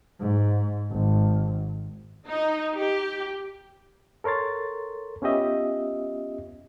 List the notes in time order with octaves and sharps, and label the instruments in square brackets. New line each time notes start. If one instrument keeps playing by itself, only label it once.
[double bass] G#2
G#1
[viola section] D#4
G4
[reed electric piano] A4 A#4 C#5 C6 A6
B3 C#4 F4 G4 D#5 E5